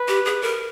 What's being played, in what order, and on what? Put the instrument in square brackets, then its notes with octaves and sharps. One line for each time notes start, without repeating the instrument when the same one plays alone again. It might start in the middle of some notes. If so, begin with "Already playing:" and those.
Already playing: [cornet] B4
[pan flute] G4
G#4
A#4